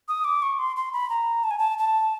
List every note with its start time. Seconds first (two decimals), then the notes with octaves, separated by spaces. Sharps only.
0.08 D#6
0.24 D6
0.42 C#6
0.59 C6
0.76 C6
0.93 B5
1.10 A#5
1.44 A5
1.51 G#5
1.58 A5
1.78 A5